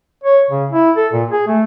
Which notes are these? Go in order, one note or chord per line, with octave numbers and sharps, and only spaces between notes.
C#5
C#3
E4
A4
A#2
G#4
A3